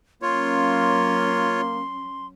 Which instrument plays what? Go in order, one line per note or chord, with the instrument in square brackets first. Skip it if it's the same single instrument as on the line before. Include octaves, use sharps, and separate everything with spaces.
[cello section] F#3 C#4 [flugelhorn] A#3 [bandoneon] F4 C#5 [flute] C6